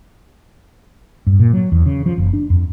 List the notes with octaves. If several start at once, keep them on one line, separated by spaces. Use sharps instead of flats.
G2
A#2
F#3
E2
C#3
F3
F#1
D4
F2